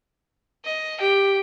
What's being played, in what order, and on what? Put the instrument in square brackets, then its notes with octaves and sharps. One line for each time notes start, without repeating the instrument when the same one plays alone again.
[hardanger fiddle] D#5
[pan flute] G4 [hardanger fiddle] G5